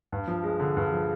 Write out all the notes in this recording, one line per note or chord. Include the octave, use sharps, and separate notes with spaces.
G2
F3
G#3
D3
G2
F3